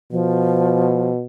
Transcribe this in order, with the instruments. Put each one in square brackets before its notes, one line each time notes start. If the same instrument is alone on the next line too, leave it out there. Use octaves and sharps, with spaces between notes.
[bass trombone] B2 [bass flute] F3